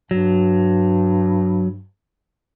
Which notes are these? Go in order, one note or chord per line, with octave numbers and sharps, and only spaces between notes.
G2 F#3